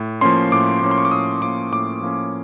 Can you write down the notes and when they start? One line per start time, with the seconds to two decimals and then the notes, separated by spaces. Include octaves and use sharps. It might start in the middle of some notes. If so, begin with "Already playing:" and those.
Already playing: A2
0.21 F3 A#3 C#4 C6
0.52 A2 D6
0.81 F3 A#3 C#4
0.91 C6
0.98 C#6
1.05 D6
1.11 A2 D#6
1.42 F3 A#3 C#4 D6
1.72 A2 D6
2.02 F3 A#3 C#4